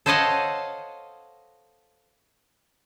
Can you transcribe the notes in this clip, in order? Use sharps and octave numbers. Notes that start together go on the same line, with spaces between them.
A4 C5 C#5 D#5 F5 F#5